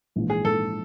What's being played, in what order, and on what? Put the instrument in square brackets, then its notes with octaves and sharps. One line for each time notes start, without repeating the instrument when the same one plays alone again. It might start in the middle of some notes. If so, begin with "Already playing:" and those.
[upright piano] A#1 G#2 E3
[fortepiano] G#4
[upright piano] A#1 G#2 E3 [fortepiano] A4